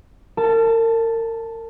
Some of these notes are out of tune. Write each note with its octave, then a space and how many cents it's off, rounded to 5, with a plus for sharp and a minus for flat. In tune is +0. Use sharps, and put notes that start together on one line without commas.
A#4 -35 A5 +0